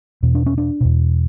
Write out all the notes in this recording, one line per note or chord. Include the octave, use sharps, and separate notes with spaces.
E2 B2
D4
C#4
D4
E2 B2